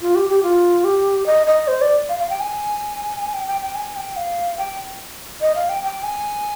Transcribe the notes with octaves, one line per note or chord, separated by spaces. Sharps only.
F4
G4
G4
F4
G4
D#5
D#5
C5
D5
F5
F5
G5
G#5
G5
G5
G5
G#5
G5
F5
G5
D#5
F5
G5
G5
G#5